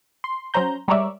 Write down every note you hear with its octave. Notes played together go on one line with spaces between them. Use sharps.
C6
F#3 C#4 C5 A#5 G6
G3 G#3 A#4 C#5 D5 E5